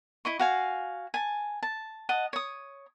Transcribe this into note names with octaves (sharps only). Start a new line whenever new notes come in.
E4 D#5 C#6
F#4 F5 G#5
G#5 A5
A5
D#5 F#5 A5
C#5 D#6